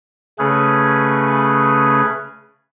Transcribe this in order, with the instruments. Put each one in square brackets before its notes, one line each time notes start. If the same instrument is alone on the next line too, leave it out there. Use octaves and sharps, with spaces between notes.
[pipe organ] C#3 A3 C#4 G#4 B4